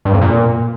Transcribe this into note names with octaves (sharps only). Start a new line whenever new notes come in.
G2
F2
A#2